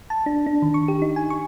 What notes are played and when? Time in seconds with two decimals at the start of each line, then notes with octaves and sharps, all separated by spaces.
0.10 A5
0.26 D4
0.46 D4
0.62 D#3
0.74 C#6
0.88 G4
1.02 D#4
1.16 G#5
1.30 C#6